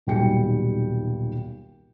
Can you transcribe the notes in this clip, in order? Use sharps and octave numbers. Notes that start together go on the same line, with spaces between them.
D#1 B1 G3 G5 C#7